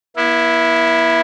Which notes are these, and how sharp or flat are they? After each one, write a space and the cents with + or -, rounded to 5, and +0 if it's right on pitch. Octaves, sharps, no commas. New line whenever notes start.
B3 -45 E4 +0